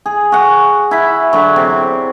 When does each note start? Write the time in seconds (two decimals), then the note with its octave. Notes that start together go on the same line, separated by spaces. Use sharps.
0.06 G#4
0.32 F#4 F#5
0.91 E4 B5
1.33 D3 F#3
1.56 C3